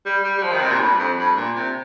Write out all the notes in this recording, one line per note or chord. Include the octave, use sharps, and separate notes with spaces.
G3
G3
G3
F3
D#3
C3
A#2
G2
F2
G2
A#2
C3